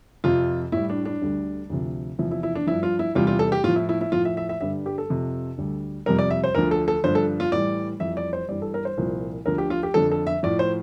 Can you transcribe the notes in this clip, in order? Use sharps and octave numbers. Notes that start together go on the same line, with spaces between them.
F2 C3 F3 F4
A2 G3 E4
D4
D4
D2 D3 G3
D2 C3 F3
E2 C3 F3 E4
E4
E4
D4
G2 F3 E4
F4
E4
E2 C3 G3 F4
F4
A4
G4
A2 F3 F4
E4
E4
E4
A2 F3 F4
E5
E5
E5
G2 D3 G3 E5
G4
A4
F2 C3 F3
D2 D3 G3
F2 C3 G3 A#4
D5
E5
C5
D2 D3 F3 A#4
A4
A4
G2 D3 F3 C5
A4
F4
A2 E3 G3 D5
F2 E3 G3 E5
D5
C5
G2 E3 G3 D5
A4
A#4
C5
C2 A#2 F3
D2 D3 F3 A#4
G4
F4
G4
F2 D3 F3 A4
A4
E5
A2 F3 D5
C5